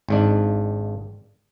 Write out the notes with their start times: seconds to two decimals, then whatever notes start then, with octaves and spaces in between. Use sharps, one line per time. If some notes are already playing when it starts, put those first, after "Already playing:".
0.09 G#1 G#2 D4